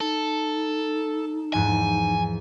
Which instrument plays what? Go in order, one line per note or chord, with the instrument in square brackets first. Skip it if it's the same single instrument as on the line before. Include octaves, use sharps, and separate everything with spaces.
[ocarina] D#4 [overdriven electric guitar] A4
[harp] E2 G#2 F3 [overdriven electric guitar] G#5